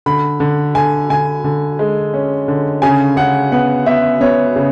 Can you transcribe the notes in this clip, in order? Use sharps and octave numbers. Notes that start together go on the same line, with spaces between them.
D3 B5
D3
D3 G#5
D3 G#5
D3
G#3
C#4
D3
C#3 G#5
C#3 F#5
B3 F#5
B3 E5
B3 C#5
C#3